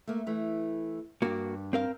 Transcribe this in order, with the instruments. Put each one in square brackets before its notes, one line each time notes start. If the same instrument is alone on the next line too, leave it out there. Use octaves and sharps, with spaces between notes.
[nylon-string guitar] A3 A#3
E3 A3
[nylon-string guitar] G2 D4 [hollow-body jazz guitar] A#3 F#4
[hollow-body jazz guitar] C4 A#4 F5